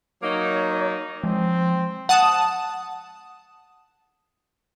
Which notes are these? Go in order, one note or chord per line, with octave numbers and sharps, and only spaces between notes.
F#3 A#3 D#4 C#5
F3 G#3 C4
F#5 A5 D#6 E7